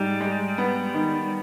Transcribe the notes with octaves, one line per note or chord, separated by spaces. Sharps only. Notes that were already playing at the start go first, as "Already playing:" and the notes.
Already playing: G#2 G3
G#3
B3
D#3